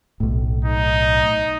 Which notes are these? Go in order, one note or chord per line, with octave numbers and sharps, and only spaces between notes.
B1 A2
D#4